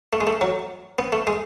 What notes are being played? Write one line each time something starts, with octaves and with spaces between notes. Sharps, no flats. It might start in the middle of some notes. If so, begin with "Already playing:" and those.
A3
G#3
A3
F#3
B3
A3
G#3